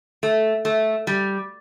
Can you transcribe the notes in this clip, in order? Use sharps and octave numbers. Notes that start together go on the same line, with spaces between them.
A3
A3
G3